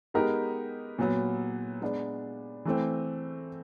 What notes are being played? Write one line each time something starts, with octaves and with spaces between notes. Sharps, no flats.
G#3 B3 D#4 G4 A#4
A#2 F#3 B3
G#3 B3 D4
E3 A3 C4